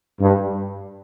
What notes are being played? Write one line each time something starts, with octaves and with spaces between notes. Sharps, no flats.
G2